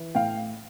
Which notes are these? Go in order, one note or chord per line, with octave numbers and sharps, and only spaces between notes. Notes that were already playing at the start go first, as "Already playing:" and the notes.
Already playing: E3
A2 F5 G5